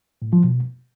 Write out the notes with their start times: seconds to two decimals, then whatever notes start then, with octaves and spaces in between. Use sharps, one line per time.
0.22 A2
0.33 F3
0.44 B2